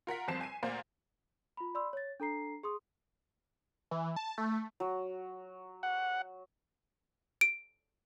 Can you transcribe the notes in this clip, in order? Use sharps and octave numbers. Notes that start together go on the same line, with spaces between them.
F4 A#4 F#5 B6
G1 F2 C4 A5 C7 E7
G#5 D#7
D2 A#2 A#3 C5 A#5 G6
F4 B5
D5 B5 C6 E6
C#5 A6
D4 A4 A#5 C7
G#4 C6 D#6
E3
A5
A3
F#3
F#5
D7